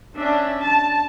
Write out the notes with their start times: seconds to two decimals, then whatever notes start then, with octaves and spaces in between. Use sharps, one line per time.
0.17 C#4 D4 E5
0.62 A5